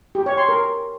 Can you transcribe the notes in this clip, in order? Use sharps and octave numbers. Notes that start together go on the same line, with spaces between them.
G4
C#5
C6
A#4